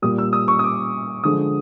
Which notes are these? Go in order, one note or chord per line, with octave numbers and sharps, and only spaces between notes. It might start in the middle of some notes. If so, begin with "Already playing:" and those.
A#2 G3 D#6
E6
D#6
C#6
D#6
D6
D3 F3 G#3 D#6